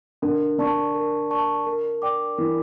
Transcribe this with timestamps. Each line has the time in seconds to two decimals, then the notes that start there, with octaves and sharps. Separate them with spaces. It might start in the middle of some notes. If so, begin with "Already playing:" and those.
0.22 D3 A#4
0.58 D3 D5 A5 C#6
0.94 A#4
1.31 D5 A5 C#6
1.66 A#4
2.02 D5 G5 D6
2.38 E3 A#4